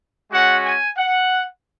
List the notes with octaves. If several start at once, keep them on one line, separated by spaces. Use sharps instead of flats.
G#3 C#4 F#4 F#5
G#5
F#5